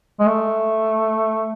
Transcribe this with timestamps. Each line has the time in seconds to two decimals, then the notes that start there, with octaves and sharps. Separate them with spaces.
0.20 G#3
0.26 A3